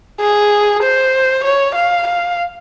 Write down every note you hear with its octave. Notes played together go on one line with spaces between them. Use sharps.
G#4
C5
C#5
F5
F5